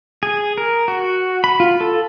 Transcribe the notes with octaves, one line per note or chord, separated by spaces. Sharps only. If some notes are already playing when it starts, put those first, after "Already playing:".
G#4
A#4
F#4
B5
F4
A4